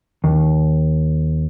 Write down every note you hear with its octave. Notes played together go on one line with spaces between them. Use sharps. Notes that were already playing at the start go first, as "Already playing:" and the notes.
D#2